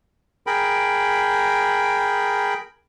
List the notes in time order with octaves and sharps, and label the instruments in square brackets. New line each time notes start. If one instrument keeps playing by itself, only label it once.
[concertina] G#4 A#4 G5 B5